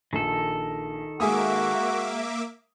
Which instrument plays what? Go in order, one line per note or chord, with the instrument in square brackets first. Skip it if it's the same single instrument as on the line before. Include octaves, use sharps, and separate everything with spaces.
[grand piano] A#1 [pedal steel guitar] D#3 A4
[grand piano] G#3 G#5 D#6 [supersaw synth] A#3 E5 D6 [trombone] F#4